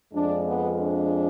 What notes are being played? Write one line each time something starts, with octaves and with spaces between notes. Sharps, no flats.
F2 F3 G#3 D4
B3
D4